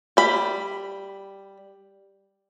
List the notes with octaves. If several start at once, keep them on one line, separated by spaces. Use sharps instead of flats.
G3 B5